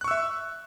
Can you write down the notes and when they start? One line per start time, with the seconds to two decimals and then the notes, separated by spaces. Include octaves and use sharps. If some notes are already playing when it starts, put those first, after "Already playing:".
0.01 F#6
0.04 C#6
0.08 E6
0.11 E5